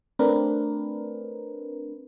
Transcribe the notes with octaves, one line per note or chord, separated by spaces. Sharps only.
A3 C4 D4 A#4 B4